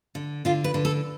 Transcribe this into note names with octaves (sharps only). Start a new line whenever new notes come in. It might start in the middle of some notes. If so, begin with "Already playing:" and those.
D3
D3 F4
B4
D3
A4